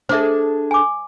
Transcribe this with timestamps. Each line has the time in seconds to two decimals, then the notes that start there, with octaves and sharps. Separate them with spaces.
0.09 D4 G#4 A4 C5 E5
0.71 G#5 D6